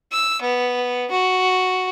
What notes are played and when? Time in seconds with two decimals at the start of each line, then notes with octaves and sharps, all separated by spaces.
0.12 E6
0.41 B3
1.11 F#4